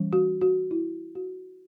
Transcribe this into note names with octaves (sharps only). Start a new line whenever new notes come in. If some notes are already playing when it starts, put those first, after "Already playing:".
Already playing: E3 G3 C#4
F#4
F#4
E4
F#4